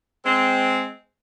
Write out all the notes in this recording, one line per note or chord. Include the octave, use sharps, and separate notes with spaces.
G#3 C4